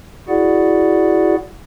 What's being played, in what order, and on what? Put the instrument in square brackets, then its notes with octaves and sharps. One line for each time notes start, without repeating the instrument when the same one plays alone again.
[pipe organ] E4 F#4 G#4 D5 F#5